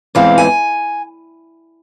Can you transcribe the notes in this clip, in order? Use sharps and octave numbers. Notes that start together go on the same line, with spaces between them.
E2 E3 G#3 C4 F5
G#5